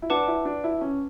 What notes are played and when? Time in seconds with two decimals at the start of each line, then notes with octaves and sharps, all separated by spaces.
0.02 E4
0.10 D4 B4 F#5 A5 D6
0.28 E4
0.45 D4
0.64 E4
0.81 C#4